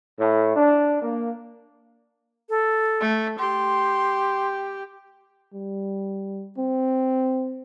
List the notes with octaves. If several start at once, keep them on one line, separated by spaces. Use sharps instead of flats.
A2
D4
A#3
A4
A3
G4 C6
G3
C4